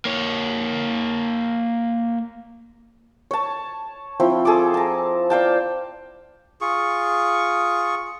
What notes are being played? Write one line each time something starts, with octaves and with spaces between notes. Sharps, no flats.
A#3 C#5
C#5 A5
F3 C4 E4
G#4 A4 A5 D6
A5 A#5
D5 F5 G5 A5
F4 G#4 C#6